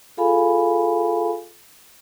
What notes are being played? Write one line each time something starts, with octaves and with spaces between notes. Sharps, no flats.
F4 G#4 A4 F5 G#5 B5